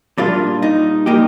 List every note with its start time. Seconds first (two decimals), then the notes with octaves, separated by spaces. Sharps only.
0.18 A#2 G3 A#3 D4 F4
0.62 D#4
1.06 A#2 G3 A#3 D#4 G4